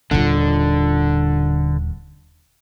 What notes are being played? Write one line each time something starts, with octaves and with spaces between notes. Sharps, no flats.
D#1 D3 F4